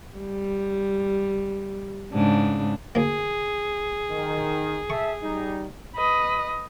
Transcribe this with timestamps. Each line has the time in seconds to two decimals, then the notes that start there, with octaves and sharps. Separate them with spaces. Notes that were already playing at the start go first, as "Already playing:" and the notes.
0.18 G3
2.13 G#2 C#3 D4
2.95 D2 A#3 G#4
4.10 D#3
4.90 A4 E5 C#6
5.23 G3 D#4
5.96 B4 D#5